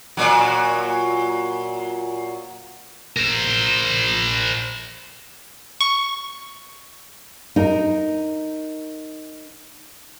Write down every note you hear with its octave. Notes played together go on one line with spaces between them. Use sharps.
A#2 F#3
A#4 C5
C#6
D#4 A#4